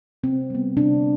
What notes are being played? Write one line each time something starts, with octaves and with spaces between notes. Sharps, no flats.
C3 C4
G3 B3
C3 D4